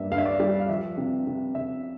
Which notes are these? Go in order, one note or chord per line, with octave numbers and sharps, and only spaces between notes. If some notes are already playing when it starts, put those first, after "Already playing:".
Already playing: G2 G3 A#3 E5
G2 F5
E5
D5
G3
F5
F3 E5
C3
C3
C3 E5